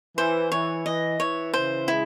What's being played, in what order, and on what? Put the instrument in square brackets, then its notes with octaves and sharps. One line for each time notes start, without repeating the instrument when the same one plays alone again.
[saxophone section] E3 [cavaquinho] C5
[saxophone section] E3 [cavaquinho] C#5
[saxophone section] E3 [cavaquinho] D#5
[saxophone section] E3 [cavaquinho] C#5
[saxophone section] C#3 [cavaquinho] C5
[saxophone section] G#3 [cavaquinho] E4